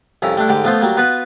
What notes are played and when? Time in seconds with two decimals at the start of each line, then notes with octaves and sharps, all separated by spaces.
0.22 C2 F2 C#4 E4 A#5
0.37 G3 A3 D4 E4
0.49 G#2 D3 G4 D6
0.64 F3 A3 B3 F4 C5
0.81 F#3 G3 A#3
0.97 B3 F4 F#4 B4